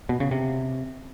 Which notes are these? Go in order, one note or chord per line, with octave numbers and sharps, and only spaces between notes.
B2
C#3
C3